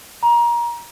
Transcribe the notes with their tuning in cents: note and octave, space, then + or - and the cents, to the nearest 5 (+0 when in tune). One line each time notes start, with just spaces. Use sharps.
A#5 +25